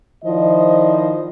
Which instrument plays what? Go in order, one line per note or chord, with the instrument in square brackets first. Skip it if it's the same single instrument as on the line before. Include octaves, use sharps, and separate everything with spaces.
[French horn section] D#3 F3 E4 C5 D5 D#5